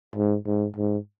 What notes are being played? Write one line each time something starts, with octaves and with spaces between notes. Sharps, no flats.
G#2
G#2
G#2